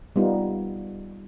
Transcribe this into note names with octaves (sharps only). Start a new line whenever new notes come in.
G3 B3 D#4 F4